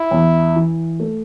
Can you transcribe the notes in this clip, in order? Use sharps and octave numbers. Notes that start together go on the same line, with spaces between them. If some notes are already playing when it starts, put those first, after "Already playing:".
Already playing: E4
E2
E3
A3